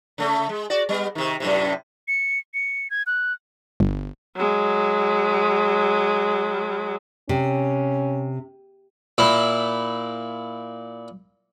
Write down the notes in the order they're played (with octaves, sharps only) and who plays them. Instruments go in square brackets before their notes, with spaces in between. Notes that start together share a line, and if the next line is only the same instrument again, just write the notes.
[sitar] C#3 A3
G#3
F#4 D5
G3 B3
C3 D#3
F#2 A2 C3
[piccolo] C#7
C#7
G#6
F#6
[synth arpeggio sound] G1
[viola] F#3 G#3
[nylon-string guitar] C3 [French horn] C#4
[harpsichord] A#2 E4